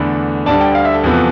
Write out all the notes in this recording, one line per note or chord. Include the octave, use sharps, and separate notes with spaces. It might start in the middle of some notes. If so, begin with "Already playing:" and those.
Already playing: E2 D3 A3 D4 B5
D2 D3 G3 D4 A5
G5
F5
E5
A4
E2 C3 F3 B3